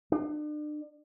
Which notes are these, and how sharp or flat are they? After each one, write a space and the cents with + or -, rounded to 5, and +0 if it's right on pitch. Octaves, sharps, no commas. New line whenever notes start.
D4 +40